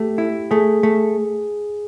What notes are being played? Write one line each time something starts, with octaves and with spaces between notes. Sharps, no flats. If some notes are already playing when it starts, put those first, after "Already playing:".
Already playing: A3 G4
E4
A3 G#4
A3